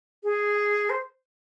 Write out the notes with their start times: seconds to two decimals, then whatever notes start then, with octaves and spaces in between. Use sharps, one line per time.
0.24 G#4
0.90 C5